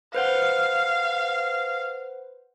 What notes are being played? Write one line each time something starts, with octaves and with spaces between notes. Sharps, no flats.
B4 C5 F5 F#5